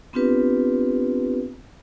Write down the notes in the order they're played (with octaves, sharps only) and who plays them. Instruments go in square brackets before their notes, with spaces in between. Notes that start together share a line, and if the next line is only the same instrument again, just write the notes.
[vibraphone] B3 C4 D4 F4 G4 B4